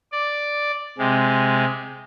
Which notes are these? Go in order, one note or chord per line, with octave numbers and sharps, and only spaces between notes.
D5
C3 G#3